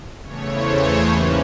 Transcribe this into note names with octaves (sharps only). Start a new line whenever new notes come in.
E2 C#3 E3 A3 C#5
C5
C5
G#2 E3 G3 A#3 C#4 B4